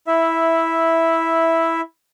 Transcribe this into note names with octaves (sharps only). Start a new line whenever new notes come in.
E4 E5